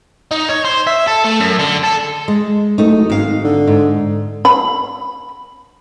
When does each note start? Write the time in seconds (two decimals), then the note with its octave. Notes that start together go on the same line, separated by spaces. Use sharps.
0.31 D#4
0.49 C#5
0.65 C5
0.87 E5
1.07 A4
1.24 A3
1.40 F#2
1.59 D3
1.84 A4
2.28 G#3
2.78 F#1 A3 D#4
3.10 G#1 G#2 F5
3.45 D3
3.67 G#2
4.45 B5